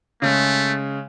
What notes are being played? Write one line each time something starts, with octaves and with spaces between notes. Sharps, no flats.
C#3 G#3 A3